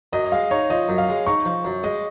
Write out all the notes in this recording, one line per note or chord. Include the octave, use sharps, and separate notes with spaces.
F#2 D#5
G#3 F5
D#4 C#5
F3 D#5
F#2
F5
G#3
D#4 C#6
F3
F#2
G#3 D#5